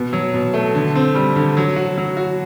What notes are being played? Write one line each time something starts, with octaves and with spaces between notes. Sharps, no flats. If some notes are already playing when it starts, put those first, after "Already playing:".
Already playing: B2
F#3
B2
A3
D3
C4
G3
D3
F#3
F#4
F#3
F#4